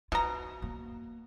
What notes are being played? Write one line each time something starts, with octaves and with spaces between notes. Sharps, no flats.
B2 F4 A#5
A#3